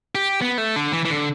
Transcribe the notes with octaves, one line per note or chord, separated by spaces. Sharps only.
G4
B3
A3
D3
E3
E3
D3